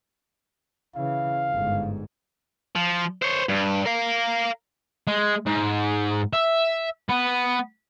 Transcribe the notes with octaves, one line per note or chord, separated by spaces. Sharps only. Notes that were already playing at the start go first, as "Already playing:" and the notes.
C#3 E3 F5
G1 G#2
F3
C5 C#5
G2
A#4 F5
G#3
G#2
E5
B3